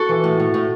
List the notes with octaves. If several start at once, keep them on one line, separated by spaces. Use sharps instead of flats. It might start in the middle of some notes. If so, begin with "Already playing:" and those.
Already playing: F#4 A4
E3
A2
A2
A2